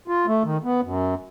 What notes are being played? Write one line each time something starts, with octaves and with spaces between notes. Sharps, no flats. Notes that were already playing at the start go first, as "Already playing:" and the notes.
F4
A3
D#3
B3
F#2